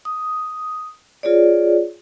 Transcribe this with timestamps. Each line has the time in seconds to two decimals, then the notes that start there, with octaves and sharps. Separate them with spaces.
0.05 D#6
1.23 F4 G#4 C#5 D5